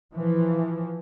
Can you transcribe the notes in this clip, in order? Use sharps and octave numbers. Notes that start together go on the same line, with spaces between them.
E3 F3